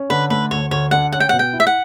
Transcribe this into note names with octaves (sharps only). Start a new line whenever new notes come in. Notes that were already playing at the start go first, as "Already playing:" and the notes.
Already playing: C#4
D3 B4
A3 B4
D2 C#5
D2 C#5
D3 F#5
C#4 F#5
G5
F#5
B2
G5
E4
E5
F#5